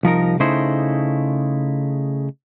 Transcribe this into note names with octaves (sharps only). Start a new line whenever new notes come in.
C2 F3 D#4 A#4
C#3 A3 D#4 E4 C5